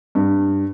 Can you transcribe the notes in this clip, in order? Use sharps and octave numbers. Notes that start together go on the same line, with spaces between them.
G2